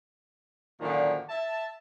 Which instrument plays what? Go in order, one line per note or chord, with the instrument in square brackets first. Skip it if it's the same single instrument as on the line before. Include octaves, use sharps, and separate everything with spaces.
[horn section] F#2 A#2 D3 D#3 F3
E5 A5